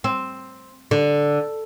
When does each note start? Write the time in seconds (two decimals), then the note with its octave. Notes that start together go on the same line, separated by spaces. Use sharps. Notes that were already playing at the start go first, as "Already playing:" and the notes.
0.04 C4
0.91 D3